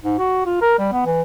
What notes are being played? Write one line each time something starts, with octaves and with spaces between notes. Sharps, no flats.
G#2
F#4
F4
A#4
G3
B3
E3